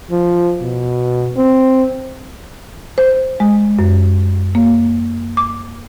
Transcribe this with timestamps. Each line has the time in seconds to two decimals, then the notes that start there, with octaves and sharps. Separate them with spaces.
0.11 F3
0.61 B2
1.37 C4
2.98 C5
3.40 G#3
3.79 F#2
4.55 A#3
5.37 D6